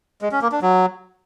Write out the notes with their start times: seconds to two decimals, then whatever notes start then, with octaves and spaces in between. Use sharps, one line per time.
0.22 G#3
0.32 C#4
0.42 A#3
0.52 D4
0.62 F#3